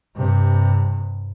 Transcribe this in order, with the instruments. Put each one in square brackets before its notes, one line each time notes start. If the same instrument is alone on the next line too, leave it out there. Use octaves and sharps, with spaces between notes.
[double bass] G2 C3